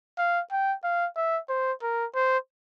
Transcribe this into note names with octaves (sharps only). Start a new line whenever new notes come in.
F5
G5
F5
E5
C5
A#4
C5